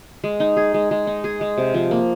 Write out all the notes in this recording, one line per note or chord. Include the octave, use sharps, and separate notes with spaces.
G#3
D#4
G#4
G#3
G#3
D#4
G#4
G#3
C3
F3
A#3